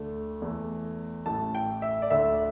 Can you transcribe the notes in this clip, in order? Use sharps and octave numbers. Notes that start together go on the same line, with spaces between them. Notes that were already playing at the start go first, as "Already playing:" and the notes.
Already playing: D2 D3 A3
E2 E3 A3
A1 A2 A3 A5
G5
E5
D5
D2 D3 A3 E5